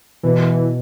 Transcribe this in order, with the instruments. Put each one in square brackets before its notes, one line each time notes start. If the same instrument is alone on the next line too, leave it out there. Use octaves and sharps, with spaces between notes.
[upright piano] B2 [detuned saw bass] E3